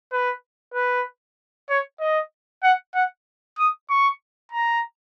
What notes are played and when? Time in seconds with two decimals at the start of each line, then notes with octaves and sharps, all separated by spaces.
0.12 B4
0.74 B4
1.70 C#5
2.00 D#5
2.63 F#5
2.94 F#5
3.58 D#6
3.90 C#6
4.52 A#5